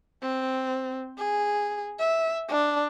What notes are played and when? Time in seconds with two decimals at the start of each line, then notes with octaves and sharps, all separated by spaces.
0.23 C4
1.18 G#4
1.99 E5
2.49 D4